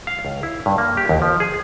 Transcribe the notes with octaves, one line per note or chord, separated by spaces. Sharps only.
F5
C#2
E4
G2
A#3
G4
D#2
F3
G#4